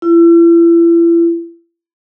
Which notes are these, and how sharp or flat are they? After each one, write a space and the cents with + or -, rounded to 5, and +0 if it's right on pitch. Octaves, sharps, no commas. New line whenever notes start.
E4 +40